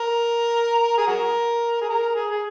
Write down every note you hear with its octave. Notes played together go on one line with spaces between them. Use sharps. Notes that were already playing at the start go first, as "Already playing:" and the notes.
Already playing: A#4
G#4
F#4 A#4
G#4
A#4
G#4
G#4